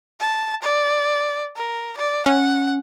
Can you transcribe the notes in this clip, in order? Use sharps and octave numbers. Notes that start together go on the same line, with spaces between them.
A5
D5
A#4
D5
C#4 F#5